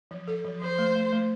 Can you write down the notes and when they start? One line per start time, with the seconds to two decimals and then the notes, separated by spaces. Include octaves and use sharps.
0.11 F3
0.28 A4
0.44 F3
0.61 F3 C5
0.78 A3
0.96 A3
1.12 A3